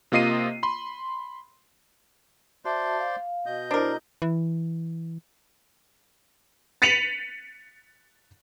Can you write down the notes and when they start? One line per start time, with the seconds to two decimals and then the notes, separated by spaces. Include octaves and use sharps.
0.12 C3 A#3 F4 D#5 C7 D#7
0.63 B5 C6
2.65 F#4 C5 D5 E5 A5 C6
2.99 F5
3.46 B2 D#5 G6
3.71 D4 E4 A#4 C5
4.22 E3
6.82 A6 B6 C#7 D#7 F7 F#7